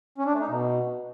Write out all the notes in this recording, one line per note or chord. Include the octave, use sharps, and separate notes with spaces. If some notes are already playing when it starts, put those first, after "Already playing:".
C#4
D4
A3
D#4
B2